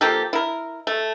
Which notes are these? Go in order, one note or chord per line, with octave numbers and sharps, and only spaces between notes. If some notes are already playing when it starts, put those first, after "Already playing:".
F3 A#3 G4 A4
E4 A#4
A3